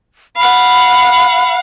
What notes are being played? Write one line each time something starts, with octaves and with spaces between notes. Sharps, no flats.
F5 F#5 B5